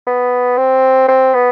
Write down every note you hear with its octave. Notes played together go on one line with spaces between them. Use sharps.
B3
C4
C4
B3